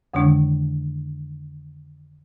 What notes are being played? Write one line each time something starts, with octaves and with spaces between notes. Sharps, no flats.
F2 D3 D#3 G#3 D4